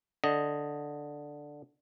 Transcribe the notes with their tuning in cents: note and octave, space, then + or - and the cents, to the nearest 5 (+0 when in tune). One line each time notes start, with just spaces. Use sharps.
D3 +0 D#5 +0